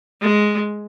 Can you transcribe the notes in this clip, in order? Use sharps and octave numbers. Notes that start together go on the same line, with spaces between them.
G#3